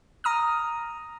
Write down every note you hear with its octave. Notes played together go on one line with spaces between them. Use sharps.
A#5 D#6 F6